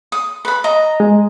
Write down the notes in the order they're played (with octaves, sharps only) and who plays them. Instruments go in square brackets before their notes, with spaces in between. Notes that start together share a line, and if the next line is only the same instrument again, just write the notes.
[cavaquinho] D#6
B4 B5
D#5 A#5
[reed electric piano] G#3